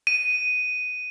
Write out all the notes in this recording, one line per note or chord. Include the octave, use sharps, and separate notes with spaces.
D#7